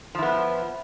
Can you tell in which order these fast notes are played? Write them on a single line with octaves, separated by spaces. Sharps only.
F3 E4 B3